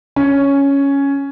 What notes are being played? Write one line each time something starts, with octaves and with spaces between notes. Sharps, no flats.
C#4